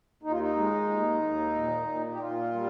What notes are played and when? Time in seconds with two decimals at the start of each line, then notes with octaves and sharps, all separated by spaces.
0.23 D#2 D#4
0.31 F4
0.40 D#4
0.56 G#3
0.89 D#2
1.22 D#2
1.55 A#2
1.88 A#2
2.12 G4
2.20 A#2 F4
2.54 G3